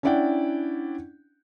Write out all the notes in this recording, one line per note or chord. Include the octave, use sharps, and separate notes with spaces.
C#4 D4 E4 D5 F#5 G5